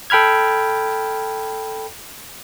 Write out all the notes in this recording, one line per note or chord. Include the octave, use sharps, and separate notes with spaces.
A4 G5 B5 F6 G#6